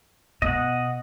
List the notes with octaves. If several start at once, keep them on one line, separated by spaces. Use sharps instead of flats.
B2 D#5 F#5